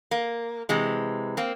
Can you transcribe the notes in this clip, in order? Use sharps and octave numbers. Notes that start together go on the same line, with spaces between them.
A#3
C3 E3 G#3
A#3 C4